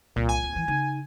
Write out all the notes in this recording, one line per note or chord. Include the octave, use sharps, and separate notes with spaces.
C2 A#2
G#5
D1
E3
C#3 D#4